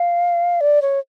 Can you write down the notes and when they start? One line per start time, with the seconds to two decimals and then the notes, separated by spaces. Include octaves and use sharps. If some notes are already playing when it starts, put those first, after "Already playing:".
Already playing: F5
0.61 D5
0.82 C#5